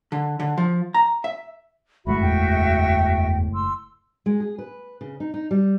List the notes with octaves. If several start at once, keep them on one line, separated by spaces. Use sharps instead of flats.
D3
D3
F3
A#5
E5
F#1 A2 G#3 F#4 E5 B5
E2 G5
C6 E6
G#3
G#4
B4
C#3
D#4
D#4
G3